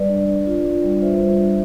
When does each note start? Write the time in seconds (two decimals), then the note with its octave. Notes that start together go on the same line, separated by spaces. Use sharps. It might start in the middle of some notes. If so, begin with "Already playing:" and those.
Already playing: G3 B4 D5
0.09 D4
0.27 D4
0.46 F4
0.64 D4
0.83 G3
1.01 F4 C5 E5
1.19 G3
1.39 D4